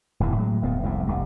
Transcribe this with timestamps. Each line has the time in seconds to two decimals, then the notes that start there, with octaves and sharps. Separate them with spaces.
0.20 D1 E2 G2 E3
0.36 A2 F#3 G#3
0.62 D1 F2 A#2 B3
0.83 F1 C2 F2 G#2
1.07 F1 C2 G2